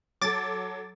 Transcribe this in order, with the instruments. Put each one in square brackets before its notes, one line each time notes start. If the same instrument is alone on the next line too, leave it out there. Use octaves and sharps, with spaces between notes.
[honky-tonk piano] F#3 A4 [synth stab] D6 A6